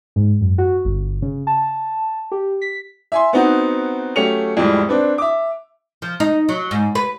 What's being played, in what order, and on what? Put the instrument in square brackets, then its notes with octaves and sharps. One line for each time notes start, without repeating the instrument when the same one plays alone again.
[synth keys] G#2
F#2
F#4
G1
C#3
A5
G4
B6
[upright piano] E5 G#5 C6
B3 C4 D#4 F#4
F#3 A3 C#4 G4 C#7 F7
F2 A2 G3 G#3
C4 D4 B4
E5 D6
[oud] F3
D#4
F#3
G#2
B4